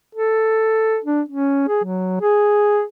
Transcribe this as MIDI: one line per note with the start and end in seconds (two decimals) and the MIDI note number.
0.15 0.98 69
1.04 1.21 62
1.29 1.65 61
1.68 1.81 68
1.84 2.19 54
2.21 2.82 68